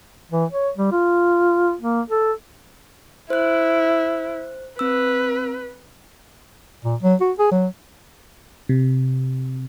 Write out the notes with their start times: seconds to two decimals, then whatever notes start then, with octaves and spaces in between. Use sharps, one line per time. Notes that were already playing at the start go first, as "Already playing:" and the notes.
0.32 E3
0.51 C#5
0.78 G3
0.92 F4
1.81 A#3
2.10 A4
3.30 E4 C5 F#6
4.79 C4 B4 E6
6.85 A#2
7.02 F#3
7.21 F#4
7.38 G#4
7.51 F#3
8.69 C3